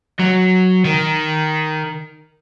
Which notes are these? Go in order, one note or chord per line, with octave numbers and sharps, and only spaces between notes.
F#3
D#3